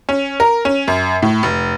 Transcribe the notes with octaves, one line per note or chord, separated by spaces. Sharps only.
C#4
A#4
C#4
F#2
A2
F1